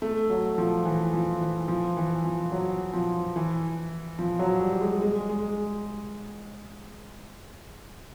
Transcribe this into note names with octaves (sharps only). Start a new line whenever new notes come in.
A3
F#3
F3
E3
F3
E3
F3
E3
F3
F#3
F3
E3
F3
F#3
G3
G#3
G#3
G#3